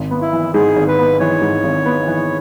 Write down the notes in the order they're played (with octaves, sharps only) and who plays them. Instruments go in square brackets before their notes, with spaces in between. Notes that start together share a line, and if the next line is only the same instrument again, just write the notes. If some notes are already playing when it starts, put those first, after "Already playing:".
Already playing: [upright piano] G#1
B3
[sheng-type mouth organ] E4
[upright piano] E3
[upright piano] G#2 [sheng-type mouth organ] G#4
[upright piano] G#1
[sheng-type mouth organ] B4
[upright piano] B3
[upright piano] E3 [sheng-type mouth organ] C#5
[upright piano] G#2
G#1
B3
E3